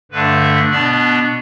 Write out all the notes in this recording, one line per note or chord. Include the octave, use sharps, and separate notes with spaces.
G2 D3 A3 D4 B4
E5
B2 B3 D4 D5